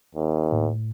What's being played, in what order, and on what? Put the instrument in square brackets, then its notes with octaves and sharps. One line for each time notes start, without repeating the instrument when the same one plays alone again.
[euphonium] D#2
[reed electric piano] A2